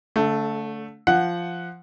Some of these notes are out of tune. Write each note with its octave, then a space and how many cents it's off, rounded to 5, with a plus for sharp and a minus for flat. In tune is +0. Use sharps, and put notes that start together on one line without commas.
D3 -40 A3 +0
F3 -10 F#5 +0